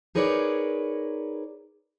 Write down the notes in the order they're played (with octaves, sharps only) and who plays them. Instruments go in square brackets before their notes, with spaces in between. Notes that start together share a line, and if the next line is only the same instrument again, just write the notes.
[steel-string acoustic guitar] D#4 G#4 A#4 B4 C#5 D5